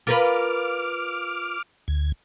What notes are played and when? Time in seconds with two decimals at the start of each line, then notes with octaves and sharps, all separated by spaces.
0.07 F4 A#4 B4 D6 F6
1.88 D2 G#6